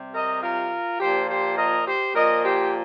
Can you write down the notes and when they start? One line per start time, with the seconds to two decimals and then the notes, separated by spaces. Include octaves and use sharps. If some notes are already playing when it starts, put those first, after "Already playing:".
Already playing: C3 G3
0.14 A#4 D#5
0.42 F4 A#4
1.00 A#2 F3 G4 C5
1.28 G4 C5
1.57 A#4 D#5
1.86 G4 C5
2.15 A#2 F3 A#4 D#5
2.44 G4 C5